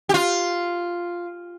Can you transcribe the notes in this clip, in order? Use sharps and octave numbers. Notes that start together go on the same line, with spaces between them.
G4
F4